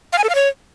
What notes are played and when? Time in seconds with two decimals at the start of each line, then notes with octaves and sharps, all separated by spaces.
0.13 F5
0.18 G#5
0.24 A4
0.29 F5
0.35 C#5